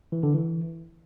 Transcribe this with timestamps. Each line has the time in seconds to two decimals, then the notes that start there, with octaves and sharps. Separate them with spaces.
0.12 E3
0.23 D3
0.34 E3